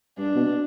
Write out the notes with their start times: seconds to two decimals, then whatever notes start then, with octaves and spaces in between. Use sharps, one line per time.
0.18 G2 D4
0.35 B2